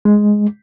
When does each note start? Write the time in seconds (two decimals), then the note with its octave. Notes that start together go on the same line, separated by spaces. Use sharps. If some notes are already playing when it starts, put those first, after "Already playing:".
0.05 G#3